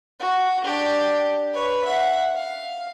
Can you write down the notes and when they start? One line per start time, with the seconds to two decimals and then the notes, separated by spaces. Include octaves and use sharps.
0.20 F#4
0.64 D4 G4
1.53 B4 C#5
1.85 E5 F#5
2.35 F5